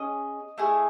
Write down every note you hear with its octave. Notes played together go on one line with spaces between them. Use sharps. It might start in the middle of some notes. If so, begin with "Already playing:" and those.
Already playing: C#4 G#4 D#5
A3 E4 G#4